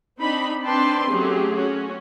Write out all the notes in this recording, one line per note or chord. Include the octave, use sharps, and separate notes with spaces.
C4 D4 D#4 B5
C4 D4 B4 G5 A5 C6
F#3 A3 C#4 G4 G#4
C#4 F#4